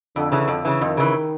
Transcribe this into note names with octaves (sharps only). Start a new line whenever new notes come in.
F2 D3
C#3 E3
F2
C#3 E3
F2 D#3
C#3 E3